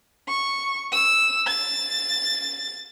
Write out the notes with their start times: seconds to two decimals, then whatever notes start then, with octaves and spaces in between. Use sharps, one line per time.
0.28 C#6
0.92 E6
1.46 A6